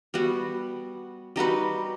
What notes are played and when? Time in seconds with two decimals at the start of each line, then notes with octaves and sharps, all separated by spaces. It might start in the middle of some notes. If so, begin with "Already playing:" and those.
0.14 G3 B3 F#4
1.36 G3 D#4 F#4 B4